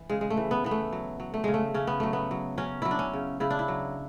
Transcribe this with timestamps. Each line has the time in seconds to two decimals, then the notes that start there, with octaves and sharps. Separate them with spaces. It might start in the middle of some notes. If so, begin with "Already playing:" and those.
Already playing: E3
0.10 C#3 G#3
0.21 G#3
0.30 A3
0.37 E3
0.51 B3
0.64 E3 B3
0.71 A3
0.93 F#3
1.20 F#3
1.34 A3
1.44 C#3 G#3
1.54 A3
1.74 C#3 C#4
1.87 B3
2.00 F#3 A3
2.13 B3
2.31 F#3
2.58 F#3 C#4
2.82 F#3 E4
2.91 D4
2.99 C#4
3.13 C#3
3.40 C#3 E4
3.51 D4
3.59 E4
3.68 F#3